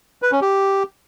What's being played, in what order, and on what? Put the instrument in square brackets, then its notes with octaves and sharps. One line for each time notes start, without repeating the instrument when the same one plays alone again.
[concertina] B4
C#4
G4